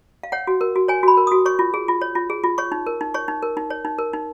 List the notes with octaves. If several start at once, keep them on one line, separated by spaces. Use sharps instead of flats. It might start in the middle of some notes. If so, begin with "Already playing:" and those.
F5
C#5 F#5
F#4
A#4
F#4
C#5 G#5
F#4 B5
A#4
F#4 D#6
C#5 C#6
F4
G#4
F4
C#5
F4
G#4
F4
C#5 C#6
D#4
A#4
D#4
C#5 C#6
D#4
A#4
D#4
C#5
D#4
A#4
D#4